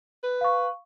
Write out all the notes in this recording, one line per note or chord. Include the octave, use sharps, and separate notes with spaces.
B4
F5 C#6